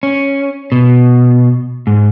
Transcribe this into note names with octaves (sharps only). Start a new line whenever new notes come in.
C#4
B2
G#2